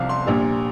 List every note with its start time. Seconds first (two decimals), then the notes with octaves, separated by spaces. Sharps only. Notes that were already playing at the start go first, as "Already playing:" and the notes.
Already playing: C2 C3 F3 F5
0.09 C6
0.26 A#1 A#2 G3